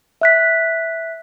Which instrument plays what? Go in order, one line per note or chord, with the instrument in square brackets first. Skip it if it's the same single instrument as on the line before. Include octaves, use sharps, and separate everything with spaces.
[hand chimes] E5 F#6 B6